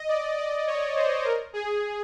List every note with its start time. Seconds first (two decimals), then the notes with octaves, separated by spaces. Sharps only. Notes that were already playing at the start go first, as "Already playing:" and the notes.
Already playing: D#5
0.08 D5
0.37 D5
0.67 C#5
0.96 C5
1.25 A#4
1.53 G#4